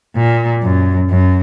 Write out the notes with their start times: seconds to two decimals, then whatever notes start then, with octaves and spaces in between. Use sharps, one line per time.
0.16 A#2
0.62 F#2
1.09 F#2